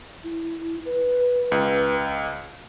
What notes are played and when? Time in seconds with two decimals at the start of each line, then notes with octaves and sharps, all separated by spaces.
0.24 E4
0.86 B4
1.52 C#2